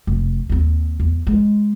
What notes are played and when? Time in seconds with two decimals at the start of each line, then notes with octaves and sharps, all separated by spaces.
0.07 F1
0.49 D#2 C4
1.00 E2
1.27 G#3